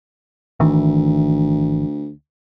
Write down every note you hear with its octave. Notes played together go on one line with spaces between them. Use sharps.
G#1 D2 D#3 E3